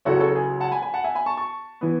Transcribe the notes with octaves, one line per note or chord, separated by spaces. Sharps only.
C#2 C#3 F#3 C#4 E4 F#4 A4
A4 C#5
G#4
F#5 A5
G#5 B5
G#5 B5
F#5 A5
E5 G#5
G#5 B5
A5 C#6
A5 C#6
E3 B3